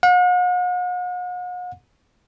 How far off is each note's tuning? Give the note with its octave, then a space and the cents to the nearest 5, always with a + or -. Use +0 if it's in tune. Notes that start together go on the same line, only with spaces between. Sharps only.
F#5 -45